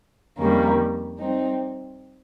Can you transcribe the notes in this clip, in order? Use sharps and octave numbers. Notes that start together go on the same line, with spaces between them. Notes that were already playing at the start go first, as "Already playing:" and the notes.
F2 D#3 G3 A#3 C#4
G3 C4 D#4